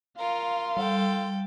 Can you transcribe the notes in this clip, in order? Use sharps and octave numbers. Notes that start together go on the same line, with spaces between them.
F4 A#4 F5 C6
G3 A4 G5